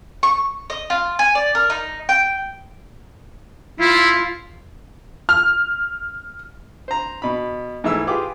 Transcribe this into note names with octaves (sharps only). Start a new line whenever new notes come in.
C#6
D#5
F4
G#5
D5
A#4
D#4
G5
E4 F4
F6
C5 A#5
B2 B5
G#2 E3 A3 E5 E6
F4 G4 G#4 B4 D6